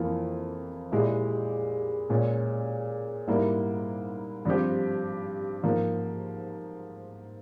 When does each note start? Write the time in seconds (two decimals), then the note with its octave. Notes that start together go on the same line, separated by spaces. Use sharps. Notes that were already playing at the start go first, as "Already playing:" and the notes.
Already playing: F2 E3 A#3 F4
0.92 A#2 G#3 E4 G4
2.09 A#2 G#3 C#4
3.28 G#2 G3 A#3 E4
4.45 G2 F3 C4 G4
5.63 G#2 F3 A#3